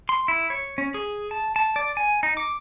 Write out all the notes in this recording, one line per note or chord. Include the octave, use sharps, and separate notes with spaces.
C6
E4
C#5
C#4
G#4
A5
A5
D5
G#5
D#4
D6